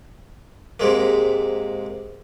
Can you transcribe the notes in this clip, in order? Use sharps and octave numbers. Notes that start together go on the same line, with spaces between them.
G#2 C3 G#3 A#3